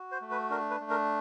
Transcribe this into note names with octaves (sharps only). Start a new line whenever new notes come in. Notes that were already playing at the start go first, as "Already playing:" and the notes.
Already playing: F#4
C5
A3
B4
D4 A#4
B4
A3
A#4